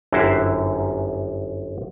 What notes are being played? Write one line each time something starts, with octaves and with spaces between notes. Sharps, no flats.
G1 F#2 E4 F#4 G4 C5